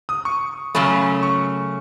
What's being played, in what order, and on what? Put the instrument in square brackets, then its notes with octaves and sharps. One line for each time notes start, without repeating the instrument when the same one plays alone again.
[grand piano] D#6
C#6
[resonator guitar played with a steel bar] F#2 C#3 F#3 A3 C#4 [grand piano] B5
[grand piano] C#6